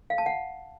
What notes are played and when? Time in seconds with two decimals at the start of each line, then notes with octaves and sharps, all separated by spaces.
0.10 F5
0.18 A5
0.26 F#5